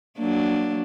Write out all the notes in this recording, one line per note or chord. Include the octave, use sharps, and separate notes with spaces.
F#3 A#3 D4